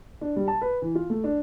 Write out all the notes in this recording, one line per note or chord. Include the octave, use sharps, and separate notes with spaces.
D4
G3
A5
B4
E3
F4
A3
D4